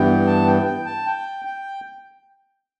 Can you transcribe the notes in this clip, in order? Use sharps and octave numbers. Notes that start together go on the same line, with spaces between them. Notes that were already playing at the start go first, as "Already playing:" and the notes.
Already playing: G2 E3 B3 G5
A5
G5
G5
A5
G5
G5